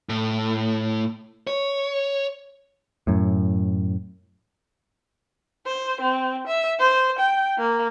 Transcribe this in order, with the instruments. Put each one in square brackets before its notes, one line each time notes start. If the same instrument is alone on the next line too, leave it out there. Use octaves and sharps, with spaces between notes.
[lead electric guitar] A2
C#5
[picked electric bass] F#2 A2
[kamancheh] C5
C4
E5
C5
G5
A#3